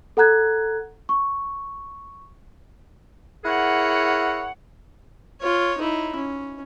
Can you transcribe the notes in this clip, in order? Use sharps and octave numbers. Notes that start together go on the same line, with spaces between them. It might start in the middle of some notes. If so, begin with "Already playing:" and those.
A4 F#5 A#5 F#6 G#6
C#6
E4 G#4 A#4 C#5 F#5
F4 C#5
D#4 E4
C#4